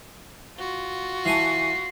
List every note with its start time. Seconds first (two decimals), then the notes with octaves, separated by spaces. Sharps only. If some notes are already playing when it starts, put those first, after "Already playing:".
0.58 F4 F#4
1.25 E3 G#5 A5 C7